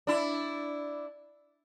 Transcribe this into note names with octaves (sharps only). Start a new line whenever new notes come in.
D4 E4